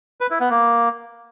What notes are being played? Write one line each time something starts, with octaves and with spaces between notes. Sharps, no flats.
B4
E4
B3
A#3